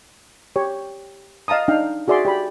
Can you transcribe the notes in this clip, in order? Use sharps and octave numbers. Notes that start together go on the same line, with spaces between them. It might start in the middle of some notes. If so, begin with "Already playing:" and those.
G4 C#5
D#5 F5 A5 A#5 D#6
D4 D#4 F5 G5
F#4 G#4 D5 E5 C6
G4 D5 B5